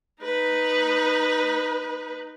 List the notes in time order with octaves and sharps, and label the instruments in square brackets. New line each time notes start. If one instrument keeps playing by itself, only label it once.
[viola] D#4 B4